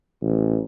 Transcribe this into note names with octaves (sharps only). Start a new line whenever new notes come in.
A1